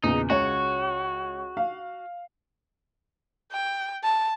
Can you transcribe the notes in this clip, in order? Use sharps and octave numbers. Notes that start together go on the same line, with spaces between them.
E2 A#2 C#3 D#4
C#2 F#4 C#5
F5
G5
A5